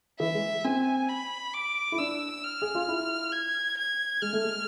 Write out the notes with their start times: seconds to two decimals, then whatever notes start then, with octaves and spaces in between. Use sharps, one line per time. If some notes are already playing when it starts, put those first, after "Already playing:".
0.20 E3 E5
0.35 G#3
0.64 C4 G#5
1.09 B5
1.53 D6
1.92 E4
1.98 D4 E6
2.43 F6
2.62 G#4
2.75 F4
2.88 E4
3.32 G#6
3.77 G#6
4.22 G#3 F6
4.33 A3
4.45 G#3